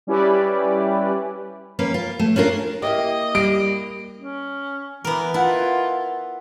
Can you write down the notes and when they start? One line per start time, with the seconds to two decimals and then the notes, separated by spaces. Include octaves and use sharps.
0.07 G3 C#4 E4 G4 B4 D5
1.79 A#3 C#4 B4
1.94 F4
2.19 A3
2.36 C#4 D4 F4 A#4
2.82 A#3 E4 G4 D#5
3.35 G3 D7
4.18 C#4
5.04 E3 B3 A#4
5.34 E4 F4 F#5 A5